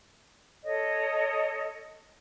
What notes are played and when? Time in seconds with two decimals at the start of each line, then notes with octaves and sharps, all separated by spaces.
0.64 A4 C#5 D#5